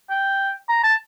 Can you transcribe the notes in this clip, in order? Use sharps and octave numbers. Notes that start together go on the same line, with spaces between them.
G5
A#5
A5